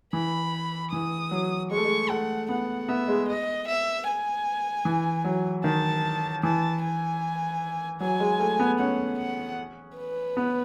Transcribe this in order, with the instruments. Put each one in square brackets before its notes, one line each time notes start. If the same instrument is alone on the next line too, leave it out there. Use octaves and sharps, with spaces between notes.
[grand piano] E3 [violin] B5
[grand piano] E3 [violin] D#6
[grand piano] F#3
[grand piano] G#3 [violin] C#6
[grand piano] A3
G#3
[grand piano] A3 [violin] F#5
[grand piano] B3 [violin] F#5
[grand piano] B3 [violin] E5
[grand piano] G#3
[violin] D#5
E5
G#5
[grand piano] E3
F#3
[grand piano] D#3 [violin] A5
[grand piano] E3 [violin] A5
[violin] G#5
[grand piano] F#3 [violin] G#5
[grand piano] G#3
A3
B3
[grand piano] C#4 [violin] F#5
[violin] F#5
B4
[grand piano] B3